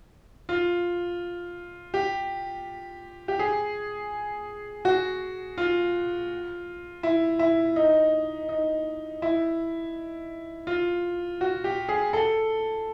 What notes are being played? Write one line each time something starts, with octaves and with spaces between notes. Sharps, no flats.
F4
G4
G4
G#4
F#4
F4
E4
E4
D#4
D#4
E4
F4
F#4
G4
G#4
A4